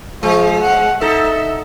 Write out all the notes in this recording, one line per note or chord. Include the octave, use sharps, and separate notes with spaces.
F3 G#3
F#5
D#4 A4 E5